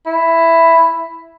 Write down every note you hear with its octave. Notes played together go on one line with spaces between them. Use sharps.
E4